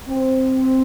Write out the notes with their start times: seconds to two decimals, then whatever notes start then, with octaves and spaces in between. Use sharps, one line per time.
0.08 C4